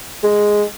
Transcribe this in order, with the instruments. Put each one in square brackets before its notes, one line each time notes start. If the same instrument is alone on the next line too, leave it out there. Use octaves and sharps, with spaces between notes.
[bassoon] G#3